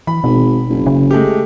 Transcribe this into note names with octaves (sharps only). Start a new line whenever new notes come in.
E3 B5
G#1 B2
F#1
C#3
G#3 A3 G4